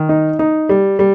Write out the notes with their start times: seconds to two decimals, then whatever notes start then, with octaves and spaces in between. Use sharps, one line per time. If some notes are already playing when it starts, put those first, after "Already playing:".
Already playing: D#3
0.09 D#4
0.39 D#4
0.69 G3
0.99 G3